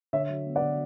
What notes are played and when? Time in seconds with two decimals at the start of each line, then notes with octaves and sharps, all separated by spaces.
0.13 D3 C#5 E5
0.29 F#3
0.46 B3
0.56 D5 F#5
0.62 D3